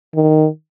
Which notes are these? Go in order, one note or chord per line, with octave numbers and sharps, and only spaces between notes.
D#3